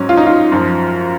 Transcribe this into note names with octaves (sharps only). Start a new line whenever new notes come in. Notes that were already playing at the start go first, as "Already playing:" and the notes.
Already playing: G#2 F#3 C#4
F4
D#4
F4
F#2 F3